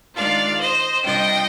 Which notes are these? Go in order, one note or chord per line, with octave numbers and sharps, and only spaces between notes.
D#3 G#3 D4 F4 D5 F5
C5 D#5
C3 G3 D4 F4 D#5 G5